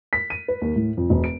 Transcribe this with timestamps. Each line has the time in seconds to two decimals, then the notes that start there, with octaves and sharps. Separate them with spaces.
0.13 B6
0.30 D#7
0.48 B4
0.62 D#2
0.76 A2
0.97 F2
1.10 E1
1.24 D7